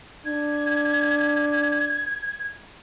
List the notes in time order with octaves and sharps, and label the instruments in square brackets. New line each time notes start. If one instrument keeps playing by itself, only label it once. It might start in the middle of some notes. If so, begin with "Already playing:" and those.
[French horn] D4 [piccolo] G#6